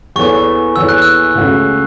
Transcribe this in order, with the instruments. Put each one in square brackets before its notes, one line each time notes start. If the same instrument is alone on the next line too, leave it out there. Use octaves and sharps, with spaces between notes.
[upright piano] E2 E3 B3 A4 C#5 [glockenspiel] C#6
[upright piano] E2 E3 B3 A4 C#5 [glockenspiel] E6
[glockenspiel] F#6
E6
[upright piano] C#2 C#3 A3 C#4 F#4